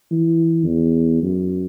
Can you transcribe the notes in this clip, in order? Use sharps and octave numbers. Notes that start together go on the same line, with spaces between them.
E3
E2
F#2